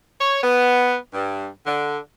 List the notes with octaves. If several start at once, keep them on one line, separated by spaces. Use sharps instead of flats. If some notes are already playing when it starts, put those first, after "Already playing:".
C#5
B3
G2
D3